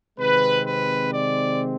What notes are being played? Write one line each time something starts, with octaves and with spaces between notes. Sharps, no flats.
C3 D#3 G#3 C4 B4
B4
D5